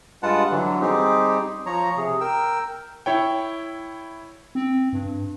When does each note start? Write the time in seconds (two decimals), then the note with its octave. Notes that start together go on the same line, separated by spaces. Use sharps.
0.23 G2 G#3 F4 B4 F#5 A5
0.51 D3 E3 F#3
0.81 G3 C4 D#4 G4 G#4
1.66 F3 C#5 A#5
1.97 C3 G#4
2.21 A#4 G5 E6
3.06 E4 C#5 G5
4.55 C4
4.93 G2